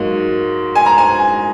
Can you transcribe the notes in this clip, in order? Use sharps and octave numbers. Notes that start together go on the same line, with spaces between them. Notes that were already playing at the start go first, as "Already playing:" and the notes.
Already playing: G#2 F#3 A#3
G#5
A#5
G#5